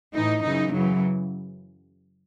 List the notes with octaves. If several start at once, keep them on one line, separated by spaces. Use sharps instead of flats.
A2 E3 D#4
F#2 C#3 E3 D#4
F#2 C#3 E3 F#3